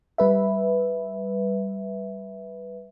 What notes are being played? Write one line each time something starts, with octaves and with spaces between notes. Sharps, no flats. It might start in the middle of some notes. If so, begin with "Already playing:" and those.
G3 B4 E5